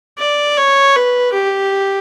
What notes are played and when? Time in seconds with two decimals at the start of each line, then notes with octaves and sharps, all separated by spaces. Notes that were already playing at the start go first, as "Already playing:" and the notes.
0.19 D5
0.57 C#5
0.96 B4
1.33 G4